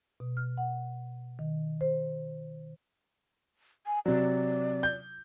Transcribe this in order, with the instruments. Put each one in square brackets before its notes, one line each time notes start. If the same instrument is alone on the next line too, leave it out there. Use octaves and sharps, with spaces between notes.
[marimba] B2
F6
F#5
D#3
C5
[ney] G#5
[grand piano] C3 F#3 [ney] D5
[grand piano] G6